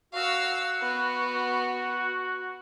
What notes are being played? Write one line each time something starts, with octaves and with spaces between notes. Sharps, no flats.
F#4 F5 E6
B3